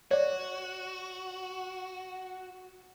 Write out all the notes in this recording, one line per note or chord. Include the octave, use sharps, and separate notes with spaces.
F#4 C#5 D5